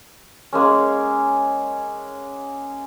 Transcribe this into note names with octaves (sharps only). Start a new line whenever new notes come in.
G#3 A#3 C#4